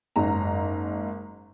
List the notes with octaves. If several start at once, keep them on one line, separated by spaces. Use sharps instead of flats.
F#1 G#2 A#5